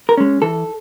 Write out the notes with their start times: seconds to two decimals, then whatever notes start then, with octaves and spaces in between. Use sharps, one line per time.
0.09 A#4
0.17 G#3 C#4
0.42 E3 A4